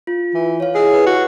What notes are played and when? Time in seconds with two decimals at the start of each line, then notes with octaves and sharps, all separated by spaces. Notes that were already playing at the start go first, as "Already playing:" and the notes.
0.07 F4
0.34 E3
0.60 C#5 F5
0.75 E4 G#4 D#5 E6
0.93 B4
1.07 F#4